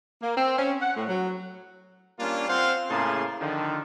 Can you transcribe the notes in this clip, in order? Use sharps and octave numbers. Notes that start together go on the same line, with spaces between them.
A#3
C4
C#4
F#5
A2
F#3
G3 A#3 C#4 D4 F4
C4 F4 C5 F5 F#5 C6
A2 C#3 A#3 G#4 A5 C6
D3 D#3 F3